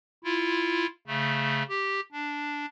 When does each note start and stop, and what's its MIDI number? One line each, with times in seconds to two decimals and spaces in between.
0.24 0.86 64
0.24 0.86 65
1.07 1.63 49
1.07 1.63 57
1.69 2.00 67
2.12 2.66 62